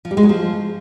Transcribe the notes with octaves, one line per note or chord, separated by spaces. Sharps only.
F3
G3
G#3
F#3
F3